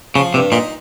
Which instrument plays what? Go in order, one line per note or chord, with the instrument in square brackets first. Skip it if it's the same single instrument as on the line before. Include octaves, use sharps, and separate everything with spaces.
[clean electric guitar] C#3 [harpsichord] F3
[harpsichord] G2 [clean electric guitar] C3
[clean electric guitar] A#2 [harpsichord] D#4